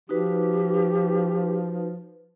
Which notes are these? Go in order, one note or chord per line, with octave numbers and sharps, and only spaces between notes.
F3 D#4 F#4 G4 B4